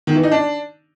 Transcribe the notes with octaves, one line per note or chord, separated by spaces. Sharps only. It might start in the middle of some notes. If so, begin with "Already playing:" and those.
D#3
E3
D#4
D4